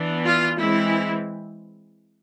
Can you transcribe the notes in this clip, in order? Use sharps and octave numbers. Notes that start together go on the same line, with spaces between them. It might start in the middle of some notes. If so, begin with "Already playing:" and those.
Already playing: E3 B3 D4
F4
E3 G#3 C4 E4